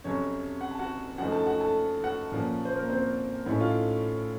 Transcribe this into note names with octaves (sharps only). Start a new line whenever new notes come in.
F2 C3 F#3 C#4 C#5
F#5
A5
F#4 F#5
F#2 F3 A3 D#4 F#4 F#5
A4 A5
F#4 F#5
A4 A5
F#4 F#5
A#2 F3 A#3 C#4
C5
A#3 A#4
C4 C5
A2 A3 C#4 D#4 C#5
F4 F5